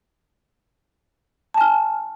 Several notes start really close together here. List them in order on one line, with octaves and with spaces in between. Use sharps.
A5 G#5 F6